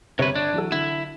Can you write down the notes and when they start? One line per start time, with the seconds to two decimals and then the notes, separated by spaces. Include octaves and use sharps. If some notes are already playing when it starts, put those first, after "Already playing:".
0.19 G1 C3 G4 B4 C#5
0.35 D4
0.54 E3 F#3 A4
0.72 D3 E4